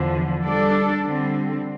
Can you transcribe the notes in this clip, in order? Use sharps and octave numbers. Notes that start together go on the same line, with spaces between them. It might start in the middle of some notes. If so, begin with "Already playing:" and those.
Already playing: E2 D3 F3
G3 D4 A4 D5
D3 G3 C4